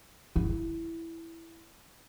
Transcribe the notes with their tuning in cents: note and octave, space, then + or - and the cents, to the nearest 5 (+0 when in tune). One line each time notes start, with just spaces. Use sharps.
E4 +5